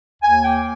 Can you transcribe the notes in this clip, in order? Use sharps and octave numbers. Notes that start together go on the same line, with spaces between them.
D#2 G#5
A#3 G5